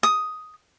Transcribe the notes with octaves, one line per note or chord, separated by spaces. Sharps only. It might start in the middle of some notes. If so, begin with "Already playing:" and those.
D#6